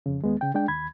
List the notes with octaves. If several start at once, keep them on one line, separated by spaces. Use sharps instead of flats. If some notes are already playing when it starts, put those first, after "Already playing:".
F2 C#3
D#2 G#3 B3
C#3 G5
G#3 D4 G5
D#2 B5 G#6